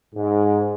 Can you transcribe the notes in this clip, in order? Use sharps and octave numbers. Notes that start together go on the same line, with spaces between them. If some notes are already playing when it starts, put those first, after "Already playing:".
G#2